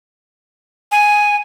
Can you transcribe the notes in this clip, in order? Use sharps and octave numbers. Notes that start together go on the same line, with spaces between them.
G#5